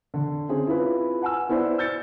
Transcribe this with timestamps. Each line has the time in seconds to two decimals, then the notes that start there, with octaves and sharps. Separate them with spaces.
0.14 D3
0.49 C4 C#4 G#4
0.67 E4 F4 B4
1.22 F#5 G#5 E6
1.49 B3 E4 B4 C5 D5
1.78 E6 G6 A6 C#7